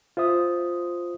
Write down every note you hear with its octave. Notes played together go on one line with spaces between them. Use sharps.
F4 C5 E5 D#6